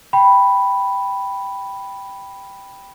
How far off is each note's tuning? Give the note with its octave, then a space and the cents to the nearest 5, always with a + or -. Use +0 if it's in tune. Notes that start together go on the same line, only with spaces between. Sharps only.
G5 +0 B5 +0